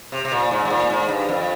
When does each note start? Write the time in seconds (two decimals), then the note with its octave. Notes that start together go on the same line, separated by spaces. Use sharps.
0.12 C3
0.25 C3
0.32 A#2
0.51 G#2
0.65 G#2
0.70 A#2
0.90 G#2
1.09 G2
1.29 F2